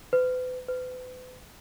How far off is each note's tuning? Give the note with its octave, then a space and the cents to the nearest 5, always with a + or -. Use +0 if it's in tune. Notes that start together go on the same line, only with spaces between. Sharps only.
B4 +40
B4 +40